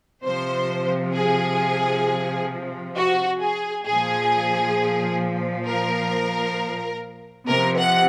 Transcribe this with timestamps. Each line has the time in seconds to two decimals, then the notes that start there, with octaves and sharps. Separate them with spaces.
0.25 C3 F3 C5
1.15 G#4
2.96 F#4
3.41 G#4
3.86 A#2 F3 G#4
5.67 A#4
7.48 C3 F3 A#4
7.78 F#5